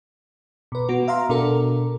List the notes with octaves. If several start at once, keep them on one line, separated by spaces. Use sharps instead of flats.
B2 B4
B3 F#4
E5 F5 A#5 C6
B2 D4 F#4 A4 A#4